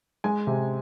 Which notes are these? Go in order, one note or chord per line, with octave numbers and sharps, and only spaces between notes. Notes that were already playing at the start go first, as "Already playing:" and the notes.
G#3 G#5
C3